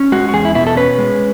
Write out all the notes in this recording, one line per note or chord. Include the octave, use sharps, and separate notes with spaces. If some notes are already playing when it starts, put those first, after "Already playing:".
Already playing: C#4
G#3 F#4
F#4
E2 G#4
E4
B2 E4
A4
C#4 B4
G#3